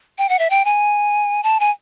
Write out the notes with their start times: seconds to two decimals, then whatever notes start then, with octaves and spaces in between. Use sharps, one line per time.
0.18 G5
0.29 F#5
0.39 E5
0.50 G5
0.65 G#5
1.43 A5
1.60 G#5